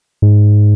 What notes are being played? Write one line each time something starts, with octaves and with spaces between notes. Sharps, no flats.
G#2